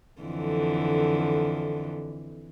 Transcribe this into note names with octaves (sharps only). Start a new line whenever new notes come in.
F2 D3 E3